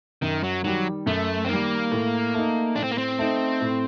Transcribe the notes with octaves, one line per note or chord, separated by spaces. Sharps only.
F#2 D#3
F#3
D#3 F#3 G3
F#2 A3
C4
D#3 G3 A#3
A2
A3 D#4
A2 D4
C4
A#3
C4
A3 D#4
A2